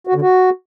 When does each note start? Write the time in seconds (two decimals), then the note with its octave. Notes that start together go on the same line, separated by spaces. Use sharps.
0.07 F#4
0.14 D3
0.22 F#4